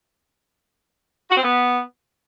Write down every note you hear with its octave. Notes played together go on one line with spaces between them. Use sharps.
F#4
C4
B3